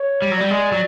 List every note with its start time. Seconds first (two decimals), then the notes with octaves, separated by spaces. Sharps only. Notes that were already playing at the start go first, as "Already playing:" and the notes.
Already playing: C#5
0.22 G3
0.31 F#3
0.36 G3 D5
0.51 G#3
0.72 F#3